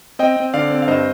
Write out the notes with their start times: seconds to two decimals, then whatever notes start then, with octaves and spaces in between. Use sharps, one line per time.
0.19 C4 D#5 G5
0.36 C4
0.54 D3 D5 F5
0.70 C4
0.82 F5
0.88 G2 C5 D#5